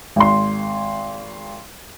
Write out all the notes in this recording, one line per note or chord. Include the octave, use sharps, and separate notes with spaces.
G#1 C6